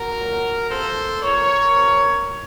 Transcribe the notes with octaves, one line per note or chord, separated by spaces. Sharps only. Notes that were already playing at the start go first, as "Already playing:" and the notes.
Already playing: F#4 A#4
A#2 F#3
C3 F3 A4 C5
A#2 F3 A#4 C#5
C3 F3